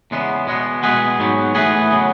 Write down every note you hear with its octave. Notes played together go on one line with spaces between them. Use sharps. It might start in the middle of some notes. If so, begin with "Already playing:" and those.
E2 C#3 G#3 B3
B2 G#3 B3
B2 G#3 B3 G#4 B4
G#2 F#3 B3
A2 E3 B3 G#4 B4
C#3 F#3 B3